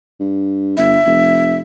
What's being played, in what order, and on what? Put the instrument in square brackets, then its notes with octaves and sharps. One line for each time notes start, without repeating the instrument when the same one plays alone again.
[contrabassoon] G2
[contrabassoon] G1 [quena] E5
[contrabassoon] F1